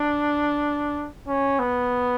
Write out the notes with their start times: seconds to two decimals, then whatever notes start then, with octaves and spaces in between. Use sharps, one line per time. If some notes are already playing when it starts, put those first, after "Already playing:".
Already playing: D4
1.27 C#4
1.59 B3